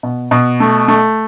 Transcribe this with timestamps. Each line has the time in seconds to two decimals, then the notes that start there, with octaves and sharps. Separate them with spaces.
0.03 B2
0.31 B2
0.60 A3
0.88 A3